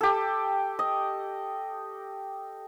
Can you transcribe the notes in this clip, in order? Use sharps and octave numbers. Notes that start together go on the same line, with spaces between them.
G4 A4
D#5